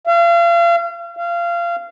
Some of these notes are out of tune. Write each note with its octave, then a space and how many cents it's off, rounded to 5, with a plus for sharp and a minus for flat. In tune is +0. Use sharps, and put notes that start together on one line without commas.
F5 -35
F5 -25